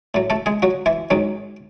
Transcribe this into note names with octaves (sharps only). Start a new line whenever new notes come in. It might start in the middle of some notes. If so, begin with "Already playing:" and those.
A2 F#3
A3 A4
G#3 G#4
F#3 F#4
E3 E4
G#2 D#3 F#3